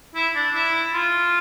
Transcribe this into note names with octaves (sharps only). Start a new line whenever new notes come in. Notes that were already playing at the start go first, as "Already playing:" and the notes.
E4
D4
E4
F4